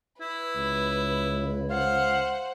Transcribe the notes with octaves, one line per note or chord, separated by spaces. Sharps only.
E4 B4
C#2
C5 F5 F#5